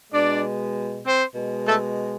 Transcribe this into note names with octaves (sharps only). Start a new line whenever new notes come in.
B2 G#3 D4 D5
C4 C5
B2 G#3
A3 A4